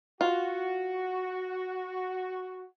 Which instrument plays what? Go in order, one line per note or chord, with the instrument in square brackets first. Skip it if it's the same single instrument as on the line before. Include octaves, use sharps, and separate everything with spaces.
[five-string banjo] F4 [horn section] F#4